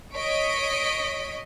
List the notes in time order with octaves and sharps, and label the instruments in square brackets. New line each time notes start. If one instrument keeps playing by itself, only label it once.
[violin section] C#5 D#5 C#6 B6 D7